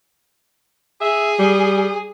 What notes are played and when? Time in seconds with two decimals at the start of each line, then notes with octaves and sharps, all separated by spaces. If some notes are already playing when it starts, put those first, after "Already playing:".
1.01 G#4 E5
1.39 G3